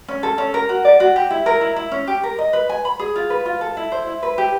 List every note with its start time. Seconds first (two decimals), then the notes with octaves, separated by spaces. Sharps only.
0.08 C#4
0.23 A4
0.38 C#4
0.54 A#4
0.69 F#4
0.85 D5
1.00 F#4
1.16 G4
1.30 E4
1.46 A#4
1.61 E4
1.76 E4
1.92 C#4
2.07 G4
2.23 A#4
2.39 D#5
2.53 B4
2.69 G#5
2.85 B5
2.99 G#4
3.16 F4
3.30 B4
3.46 F4
3.61 A4
3.77 E4
3.92 C5
4.07 E4
4.23 B4
4.38 G4